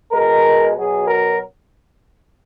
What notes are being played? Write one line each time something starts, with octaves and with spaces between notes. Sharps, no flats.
B2 G#3 A#4
B2 F#3 G#4
A#4